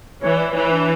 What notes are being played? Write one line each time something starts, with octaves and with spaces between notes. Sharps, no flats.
E3 C#5
D5
E3 C#5
D4